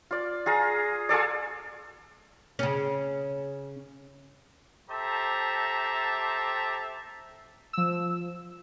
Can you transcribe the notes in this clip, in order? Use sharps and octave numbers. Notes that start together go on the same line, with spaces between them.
F4 D5
F4 G#4 A#5
F4 G#4 A4 D5
C#3 C#4
G4 A4 C5 E5 A5 A#5
F3 E6